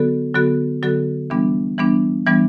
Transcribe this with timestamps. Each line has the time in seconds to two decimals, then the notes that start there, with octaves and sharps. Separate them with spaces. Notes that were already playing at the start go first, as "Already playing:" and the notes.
Already playing: D3 F#3 B3 F#4 A4
0.34 D3 F#3 B3 F#4 A4
0.83 D3 F#3 B3 F#4 A4
1.30 E3 G3 B3 D4
1.78 E3 G3 B3 D4
2.26 E3 G3 B3 D4